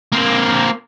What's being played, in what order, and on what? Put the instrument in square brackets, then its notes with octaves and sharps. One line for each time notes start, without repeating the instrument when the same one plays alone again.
[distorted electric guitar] A#3 C4